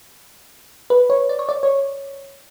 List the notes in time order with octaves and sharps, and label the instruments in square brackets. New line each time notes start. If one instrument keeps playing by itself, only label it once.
[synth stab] B4
C#5
D5
C#5
D5
C#5